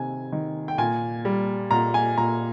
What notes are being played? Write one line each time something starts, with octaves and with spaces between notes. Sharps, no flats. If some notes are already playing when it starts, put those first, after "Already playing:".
Already playing: C3 D#3 G#5
D#3
G5
A#2 G#5
G3
A#2 A#5
G#5
A#2 A#5